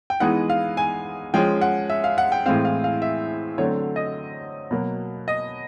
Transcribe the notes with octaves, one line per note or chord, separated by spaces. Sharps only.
G5
E3 G#3 B3 D#4 F#5
F5
G#5
F3 G#3 C#4 G5
F#5
E5
F5
F#5
G5
A2 E3 G#3 C4 F5
F5
F5
E5
D3 F#3 A3 C4 C#5
D#5
B2 F#3 A#3
D#5